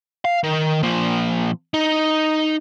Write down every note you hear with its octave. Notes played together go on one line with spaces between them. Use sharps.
F5
D#3
A#2 F3
D#4